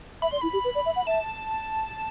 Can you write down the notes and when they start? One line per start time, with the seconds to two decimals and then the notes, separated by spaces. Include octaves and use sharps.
0.22 E5 B5
0.31 D5 C6
0.41 E4 B5
0.53 G4
0.65 B4
0.75 D5
0.86 E5
0.96 F#5
1.07 E5 A5